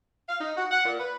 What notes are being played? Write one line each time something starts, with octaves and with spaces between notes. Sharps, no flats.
F5
D#4
F#4
F#5
A#2
B4